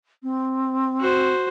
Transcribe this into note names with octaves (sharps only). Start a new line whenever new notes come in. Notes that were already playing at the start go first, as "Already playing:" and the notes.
C4
F#4 C5